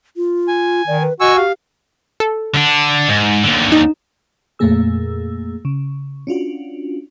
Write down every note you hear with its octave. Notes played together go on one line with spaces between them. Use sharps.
F4
G#5
D#3 D5
B4
F#4 D#5 G#5 C#6 E6
G4 F5
A4
D3 D4
G#2
D#2 D3
D#4
F2 A#2 A3 A#3 G#4 E6
C#3
C#4 D4 F4 F#4